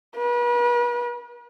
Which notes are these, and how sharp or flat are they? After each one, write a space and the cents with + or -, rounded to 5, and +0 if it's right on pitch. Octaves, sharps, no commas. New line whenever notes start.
B4 -40